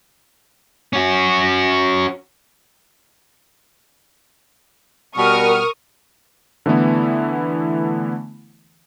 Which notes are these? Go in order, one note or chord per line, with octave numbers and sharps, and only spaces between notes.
C#4 F#4
B2 G3 A#4 C#6 D#6 F6
D3 E3 A3 B3 E4